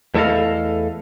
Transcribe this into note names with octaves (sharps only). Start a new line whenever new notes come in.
E2 A3 E4 A4 D#5 F5